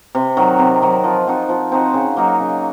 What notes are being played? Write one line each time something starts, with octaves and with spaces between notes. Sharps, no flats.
C3
D#3 F#3
C3
D#3 F#3
F3
C4 D#4 F#4
F3
C4 D#4 F#4
C#3
F#3 A#3 D#4
C#3